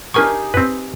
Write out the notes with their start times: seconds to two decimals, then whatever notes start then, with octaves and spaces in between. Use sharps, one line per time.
0.14 D4 D#4 G4 G#4 A#4 C#6
0.54 C4 B4